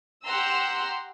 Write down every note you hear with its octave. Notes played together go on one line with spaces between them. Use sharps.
G4 F#5 A#5 C6 E6